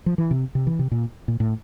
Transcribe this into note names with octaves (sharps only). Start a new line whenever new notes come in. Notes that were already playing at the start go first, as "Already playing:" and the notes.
F3
E3
C3
C3
E3
C3
A#2
A#2
A2